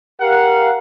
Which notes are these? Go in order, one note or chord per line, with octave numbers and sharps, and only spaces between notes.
G4 A#4 F5 F#5